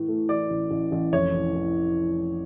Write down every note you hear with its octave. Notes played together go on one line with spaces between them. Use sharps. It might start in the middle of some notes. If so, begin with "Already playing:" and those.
Already playing: A2 E3
A3
E3 D5
A1
A1
A1
F1 C#5
E3
E3